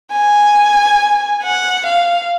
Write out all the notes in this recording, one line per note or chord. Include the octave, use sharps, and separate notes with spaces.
G#5
F#5
F5